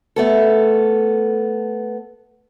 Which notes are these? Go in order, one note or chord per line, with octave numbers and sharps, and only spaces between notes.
A3 B3 A4